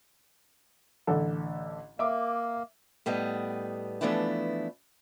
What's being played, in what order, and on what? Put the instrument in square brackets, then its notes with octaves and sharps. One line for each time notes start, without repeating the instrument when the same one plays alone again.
[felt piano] A1 D3 A4
[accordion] A#3 [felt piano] E5 D6
[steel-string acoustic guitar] A2 G3 B3 D#5
E3 F3 A3 B3 D4 E4